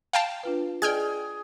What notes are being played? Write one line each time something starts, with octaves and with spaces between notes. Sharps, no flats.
F5 G5 A5
D4 F4 B4
G#4 D5 D#5 G5 F6 G#6